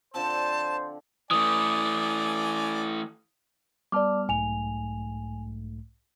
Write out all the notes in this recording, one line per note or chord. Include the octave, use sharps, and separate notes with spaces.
D3 F3 C4 C5 A5
E3 A3 D5 G#5 D#6
G3 B3 D5 A5 D6 F6
B1 G#2 A3 G#5 F7